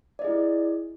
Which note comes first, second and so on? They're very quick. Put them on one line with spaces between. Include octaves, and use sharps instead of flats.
D5 D#5 G#4 E4